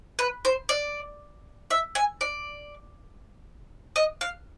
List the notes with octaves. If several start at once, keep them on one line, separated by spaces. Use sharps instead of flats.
B4
C5
D5
E5
G#5
D5
D#5
F5